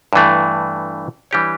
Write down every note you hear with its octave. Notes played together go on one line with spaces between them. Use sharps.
G2 E3 A3
E3 G3 D4 G4 C#5